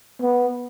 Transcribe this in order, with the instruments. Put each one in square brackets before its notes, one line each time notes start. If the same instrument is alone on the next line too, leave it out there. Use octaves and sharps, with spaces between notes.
[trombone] B3